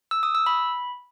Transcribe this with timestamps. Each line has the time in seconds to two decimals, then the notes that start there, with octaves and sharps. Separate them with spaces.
0.11 E6
0.23 D#6
0.35 E6
0.46 B5